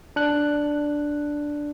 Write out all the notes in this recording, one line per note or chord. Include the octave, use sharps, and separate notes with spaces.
D4 F#6